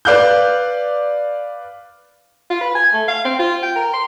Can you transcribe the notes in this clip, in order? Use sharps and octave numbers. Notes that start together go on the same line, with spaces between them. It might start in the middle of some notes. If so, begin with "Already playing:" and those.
B4 D5 F5 F#6 G6
F4
B4
G#5
A3
F5
C4
F4
G5
A#4
C6